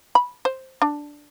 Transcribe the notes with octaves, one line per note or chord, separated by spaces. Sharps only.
B5
C5
D4